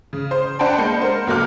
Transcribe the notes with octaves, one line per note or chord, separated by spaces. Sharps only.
C#3
C5
D4 C5 F#5 G5 A5 B5
G#3 A#3 G6 C#7
A#4 C5
C#2 F#3 A#3 A4 D6 F6